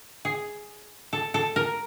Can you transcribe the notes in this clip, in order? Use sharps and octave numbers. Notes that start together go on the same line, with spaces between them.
G#4
A4
A4
A#4